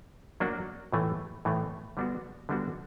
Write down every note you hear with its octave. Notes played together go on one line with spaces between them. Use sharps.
F#3 A#3 D4 F#4
A2 E3 A3
A2 E3 A3
D3 G3 B3 D4 F#4
D3 G3 B3 D4 F#4